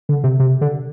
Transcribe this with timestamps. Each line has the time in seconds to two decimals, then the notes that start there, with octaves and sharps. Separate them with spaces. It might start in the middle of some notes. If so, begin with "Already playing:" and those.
0.09 D3
0.24 C3
0.40 C3
0.61 D3